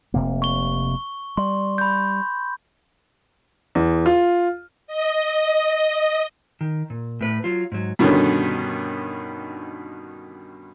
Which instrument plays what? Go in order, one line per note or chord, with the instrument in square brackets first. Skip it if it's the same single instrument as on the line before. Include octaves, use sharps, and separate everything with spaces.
[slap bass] F1 C3 A#3
[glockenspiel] C#6 G7
[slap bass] G3 [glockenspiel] C6
[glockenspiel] B5 G6
[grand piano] E2
F4
[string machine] D#5
[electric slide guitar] D#3
A#2
A2 B4
F#3 F4
G#2 F#3
[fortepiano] G2 B2 D3 D#3 C#4